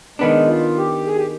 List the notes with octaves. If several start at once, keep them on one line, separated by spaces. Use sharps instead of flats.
D#3 G#3 B3 D4
F4
G4
G#4
G4